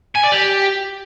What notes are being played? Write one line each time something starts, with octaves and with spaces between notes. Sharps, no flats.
G#5
D5
G4